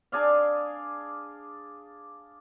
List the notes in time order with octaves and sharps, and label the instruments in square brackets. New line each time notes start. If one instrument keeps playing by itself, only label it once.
[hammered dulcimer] D4 G#4 D5 F5